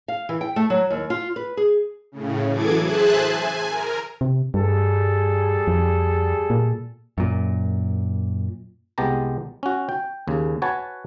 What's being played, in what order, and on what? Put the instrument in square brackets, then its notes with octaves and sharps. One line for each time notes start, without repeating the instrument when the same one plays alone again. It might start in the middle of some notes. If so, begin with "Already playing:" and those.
[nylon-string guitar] F5
E3
G5
A3
F#3
D#2
F4
B4
G#4
[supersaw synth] A2 C#3
E3 F#3 G#4 A4 D6 G#6
G#4 C5 E5 G#5 A5 F#6
G#5
A#4
[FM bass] C3
[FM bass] G2 [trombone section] G3 G#4 A4
[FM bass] F2
A#2
[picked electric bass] F#2 A#2
[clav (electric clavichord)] C2 G#3 B3 G4 A5 A#5
C#4 F#4
G5
D#2 C#3
F#4 B4 C#5 F#5 G#5 A5